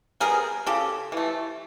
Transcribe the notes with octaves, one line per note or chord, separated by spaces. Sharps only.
G3 B3 G#4 A#4
C#3 G4 A4
E3 A3